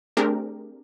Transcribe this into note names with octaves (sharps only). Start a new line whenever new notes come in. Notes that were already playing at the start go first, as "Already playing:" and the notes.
A3 C4 D4 G4 G#4 A#4